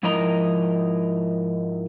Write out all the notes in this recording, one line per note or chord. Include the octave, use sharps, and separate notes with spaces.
G#2 F3 E4 A#4 D#5 A#5